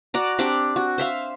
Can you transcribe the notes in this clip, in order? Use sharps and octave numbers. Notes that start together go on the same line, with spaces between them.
F#4 D5 A#5
C4 D4 G4 D5
F#4
C5 E5 F5